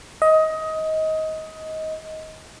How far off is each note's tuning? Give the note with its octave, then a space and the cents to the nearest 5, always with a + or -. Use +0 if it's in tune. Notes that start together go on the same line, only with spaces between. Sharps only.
D#5 +20